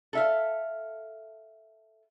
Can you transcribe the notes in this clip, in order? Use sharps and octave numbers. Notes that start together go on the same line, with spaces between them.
A4 E5 F5